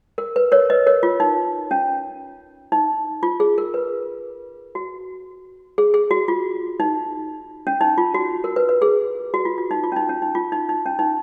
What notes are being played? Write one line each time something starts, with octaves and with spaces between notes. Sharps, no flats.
A#4
B4
A#4 C#5
B4 D#5
A#4 C#5
F4
D#4
C#4
D#4
F4
G#4
A#4
B4
F#4
G#4
G#4
F#4
F4
D#4
C#4
D#4
F4
F#4
A#4
B4
B4
G#4
F#4
F4
F4
D#4
F4
C#4
D#4
C#4
D#4
F4
D#4
D#4
C#4
D#4